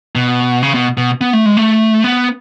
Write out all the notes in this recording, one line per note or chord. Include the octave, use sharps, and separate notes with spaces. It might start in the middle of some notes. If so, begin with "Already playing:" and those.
B2
C#3
B2
B2
B3
A3
G#3
A3
B3